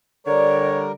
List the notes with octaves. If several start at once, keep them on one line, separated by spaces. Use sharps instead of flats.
D3 G3 A#4 C#5 D5